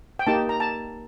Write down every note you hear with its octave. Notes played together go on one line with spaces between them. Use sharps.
G5
A#3 D#4 G4 A5
A#5
A5